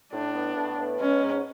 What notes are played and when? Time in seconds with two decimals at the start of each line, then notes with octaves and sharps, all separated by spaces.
0.12 A2 D4
0.34 B3
0.56 A2
0.79 B3
1.00 G#3 C#4
1.22 G#2